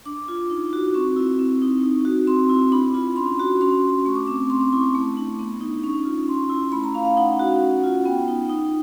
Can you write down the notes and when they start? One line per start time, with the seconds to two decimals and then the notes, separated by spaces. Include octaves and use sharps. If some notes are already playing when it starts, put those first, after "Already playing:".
0.06 D4 D6
0.28 F4
0.50 D#4
0.73 F#4
0.94 C4 C#6
1.16 E4
1.39 C4
1.62 D#4
1.84 D#4
2.05 F#4
2.27 C4 C6
2.50 E4
2.72 D4 B5
2.94 F4 B5
3.16 C#4 C6
3.39 F#4
3.61 C#4 C6
3.84 F#4
4.06 A3 C#6
4.16 D6
4.27 C4 C#6
4.50 C#4 C6
4.61 D6
4.72 E4 C#6
4.84 C#6
4.95 A3
5.17 D4
5.39 B3
5.61 D#4
5.83 C#4 C#6
6.05 F4
6.28 C#4 C6
6.50 E4
6.72 A3 B5
6.84 A#5
6.94 C#4 F5
7.05 F5
7.17 D#4 F#5
7.39 F#4
7.62 C#4
7.84 F4
8.06 B3 G5
8.28 D#4
8.50 D#4